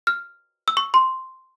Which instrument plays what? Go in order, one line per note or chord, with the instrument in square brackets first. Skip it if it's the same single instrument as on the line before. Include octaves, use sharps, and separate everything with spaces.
[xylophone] F6
E6
C#6
C6